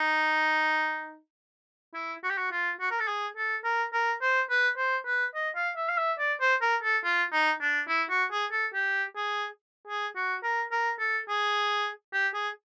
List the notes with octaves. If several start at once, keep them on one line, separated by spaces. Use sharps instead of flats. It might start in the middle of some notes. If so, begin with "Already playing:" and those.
Already playing: D#4
E4
F#4
G4
F#4
F4
F#4
A#4
A4
G#4
A4
A#4
A#4
C5
B4
C5
B4
D#5
F5
E5
F5
E5
D5
C5
A#4
A4
F4
D#4
D4
E4
F#4
G#4
A4
G4
G#4
G#4
F#4
A#4
A#4
A4
G#4
G4
G#4